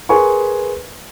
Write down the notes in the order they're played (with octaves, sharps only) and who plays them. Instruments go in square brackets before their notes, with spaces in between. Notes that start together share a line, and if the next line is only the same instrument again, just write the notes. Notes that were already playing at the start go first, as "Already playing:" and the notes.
[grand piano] G#4 A#4 B4 G#5 C6 C#6